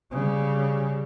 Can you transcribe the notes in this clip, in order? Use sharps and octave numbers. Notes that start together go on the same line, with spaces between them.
C#3 G3